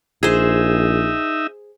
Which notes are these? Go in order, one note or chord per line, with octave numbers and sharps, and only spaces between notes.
A#1 D#4 G#4 C5 E5